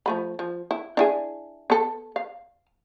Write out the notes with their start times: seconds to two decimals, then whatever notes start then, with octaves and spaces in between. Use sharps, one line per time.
0.06 F3 A3 B5
0.39 F3
0.71 E4
0.97 D4 E4 G#4
1.70 B3 A4
2.16 F5